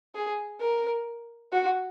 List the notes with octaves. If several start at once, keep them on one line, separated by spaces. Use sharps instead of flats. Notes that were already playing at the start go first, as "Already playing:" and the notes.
G#4
A#4
F#4